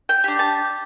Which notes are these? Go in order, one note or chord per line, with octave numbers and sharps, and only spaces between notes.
G5
D4 G4
A5